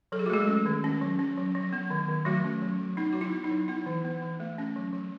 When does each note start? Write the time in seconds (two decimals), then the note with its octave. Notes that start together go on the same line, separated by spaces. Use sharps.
0.12 F#3 A4
0.19 G#4
0.26 F#4
0.30 G#3 A3 G#4
0.48 C#4
0.66 D#3
0.84 C#4
1.01 F#3
1.19 C#4
1.38 F#3
1.55 F#3
1.73 B3
1.90 D#3
2.08 D#3
2.25 F#3 A3 F#4
2.44 C#4
2.62 F#3
2.80 F#3
2.97 B3 D#4
3.13 F#3 F#4
3.21 E4
3.33 B3
3.44 D#4
3.51 F#3
3.68 B3 E4
3.86 E3
4.05 B3
4.22 E3
4.40 A3
4.58 C#4
4.76 F#3
4.93 F#3